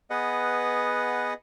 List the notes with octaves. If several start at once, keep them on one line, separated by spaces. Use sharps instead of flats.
B3 G#4 B4 D#5 F#5